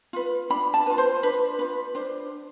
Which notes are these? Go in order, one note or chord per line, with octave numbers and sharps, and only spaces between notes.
F4 B4
D4 B5
A5
F4 B4
C5
D4 B4
F4 B4
D4 C5